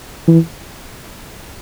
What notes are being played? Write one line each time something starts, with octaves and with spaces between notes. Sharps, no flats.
E3